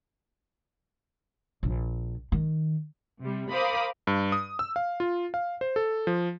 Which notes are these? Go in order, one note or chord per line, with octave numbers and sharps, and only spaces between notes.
A#1
D#3
C3 G3
A#4 C5 F5 B5 D6 D#6
G2
D#6
E6
F5
F4
F5
C5
A4
F3